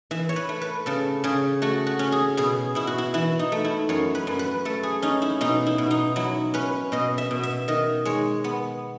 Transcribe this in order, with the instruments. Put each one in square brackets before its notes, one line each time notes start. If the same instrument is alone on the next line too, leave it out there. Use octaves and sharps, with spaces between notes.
[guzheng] E3 E5
C#5
B4
A3
B4
C#3 A4
C#3 G#4
A3 F#4
F#4
C#4
G#4
B2 G#4
B2 E4
F#4
E4
E3 E4
D#4
A3
E4
F#2 C#5
B4
F#2
B4
A3 A4
G#4
C#4 D#4
E4
B2 D#4
E4
B2
D#4
F#3 E4
C#4 B4
B2 D#5
E5
B2
E5
D#3 D#5
G#3 C#5
B3